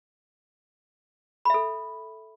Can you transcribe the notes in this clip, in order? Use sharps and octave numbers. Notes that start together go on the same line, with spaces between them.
A4 E5 B5